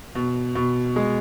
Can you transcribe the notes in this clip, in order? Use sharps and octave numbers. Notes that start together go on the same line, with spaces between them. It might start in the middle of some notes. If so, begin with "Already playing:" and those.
B2
B2
G#3